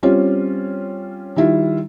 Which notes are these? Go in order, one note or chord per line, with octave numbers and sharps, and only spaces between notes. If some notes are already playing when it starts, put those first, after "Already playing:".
G3 C4 C#4 F4
D#3 G3 E4 F4